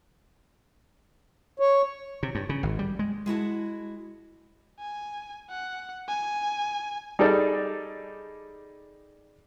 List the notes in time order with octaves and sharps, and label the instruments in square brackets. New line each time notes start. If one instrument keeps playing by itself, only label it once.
[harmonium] C#5
[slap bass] C3
G2
C#3
G#1
G3
G#3
[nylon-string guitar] G#3 E4 F#4 A5
[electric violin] G#5
F#5
G#5
[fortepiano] G3 D#4 G#4 A4 D5